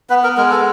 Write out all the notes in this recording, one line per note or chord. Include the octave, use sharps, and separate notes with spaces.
B3 B4
A#4
G#3 A#4
A4